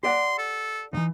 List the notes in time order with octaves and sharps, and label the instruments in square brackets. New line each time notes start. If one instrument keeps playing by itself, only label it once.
[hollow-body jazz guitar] G4 D5 F#5 [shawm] C6
[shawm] A4
[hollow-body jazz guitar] D#2 E3 [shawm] D#4